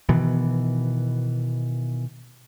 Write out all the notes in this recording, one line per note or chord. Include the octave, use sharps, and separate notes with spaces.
B2 D#3 E3 B3